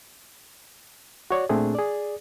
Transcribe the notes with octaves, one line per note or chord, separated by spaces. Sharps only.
F#4 C#5 D5
A#2 A3 C4 D4 G#4
G#4 D5